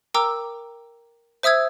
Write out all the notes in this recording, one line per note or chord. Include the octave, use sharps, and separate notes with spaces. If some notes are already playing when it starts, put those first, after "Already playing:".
A#4 G5 A#5 D6 E6
C5 E5 D#6 E6 G#6